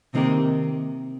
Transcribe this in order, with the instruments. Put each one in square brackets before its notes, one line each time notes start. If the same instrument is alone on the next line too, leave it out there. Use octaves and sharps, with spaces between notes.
[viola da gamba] C3 [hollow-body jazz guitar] D#3 A#3 D#4 A#4